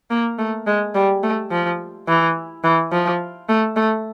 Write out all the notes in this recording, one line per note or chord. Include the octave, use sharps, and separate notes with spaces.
A#3
A3
G#3
G3
A3
F3
E3
E3
F3
A3
A3